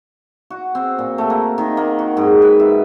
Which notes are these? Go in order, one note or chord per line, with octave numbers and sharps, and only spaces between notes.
F#4
C4
A#2
A3
A#3
D#3
A#3
F#4
G#2
B4
E5